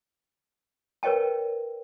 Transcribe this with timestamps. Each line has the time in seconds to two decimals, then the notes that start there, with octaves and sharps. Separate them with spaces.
1.03 A#4 B4 C#5 D#5 G5 A5